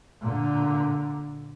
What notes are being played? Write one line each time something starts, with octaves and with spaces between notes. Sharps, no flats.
A#2 D3